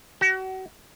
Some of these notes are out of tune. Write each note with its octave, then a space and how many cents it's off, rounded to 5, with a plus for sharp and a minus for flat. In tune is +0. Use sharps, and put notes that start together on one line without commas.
F#4 +35